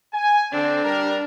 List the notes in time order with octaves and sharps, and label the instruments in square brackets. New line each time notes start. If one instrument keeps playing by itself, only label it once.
[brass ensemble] G#5
[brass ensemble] D3 C4 [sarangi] D4
[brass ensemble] G3 A#4